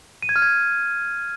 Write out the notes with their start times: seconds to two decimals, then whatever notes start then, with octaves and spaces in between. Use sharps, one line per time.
0.23 D#7
0.29 G#6
0.36 F6
0.42 G#6